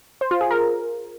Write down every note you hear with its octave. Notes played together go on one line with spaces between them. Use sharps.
C5
F4
G#4
A#4